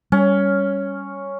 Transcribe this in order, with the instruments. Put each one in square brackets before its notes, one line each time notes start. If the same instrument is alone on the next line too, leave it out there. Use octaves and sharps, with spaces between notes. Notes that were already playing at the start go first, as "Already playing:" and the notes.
[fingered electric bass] G3 [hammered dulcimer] C#4